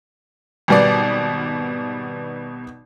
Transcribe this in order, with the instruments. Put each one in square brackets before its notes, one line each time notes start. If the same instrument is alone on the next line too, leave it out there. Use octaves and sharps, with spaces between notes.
[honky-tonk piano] G#1 B2 G3 B3 D5